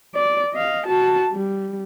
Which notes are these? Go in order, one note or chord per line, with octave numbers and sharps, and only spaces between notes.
D5
D#5 F5
F#4 A5
G3